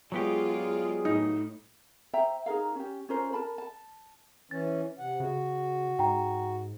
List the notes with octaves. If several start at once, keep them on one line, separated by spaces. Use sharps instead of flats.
F#3 G#3 B3 F4 G4 G#4 D5
A2 D#4
C5 E5 G5 A#5
D#4 G#4 A#4 F5
C#4 G4
C#4 F4 A#4 C5
A#4 A5 B5
A5
E3 C#4 A6
C3 F#5
C#3 F#4
G#2 G5 A#5